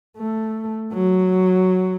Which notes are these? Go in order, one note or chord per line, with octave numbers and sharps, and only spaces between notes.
A3
F#3